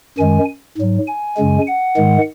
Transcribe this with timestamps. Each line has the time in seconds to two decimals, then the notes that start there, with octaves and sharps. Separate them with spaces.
0.18 F#2 D#3 G#3 G#5
0.77 G#2 F#3
1.07 G#5
1.37 F#2 C#3 G#3
1.67 F#5
1.96 G#2 D#3 G#3